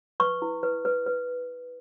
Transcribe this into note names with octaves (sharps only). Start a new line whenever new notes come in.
B4 C#6
E4
B4
B4
B4